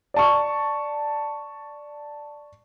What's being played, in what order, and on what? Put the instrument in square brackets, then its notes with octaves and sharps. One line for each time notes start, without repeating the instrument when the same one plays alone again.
[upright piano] D5 A5 C#6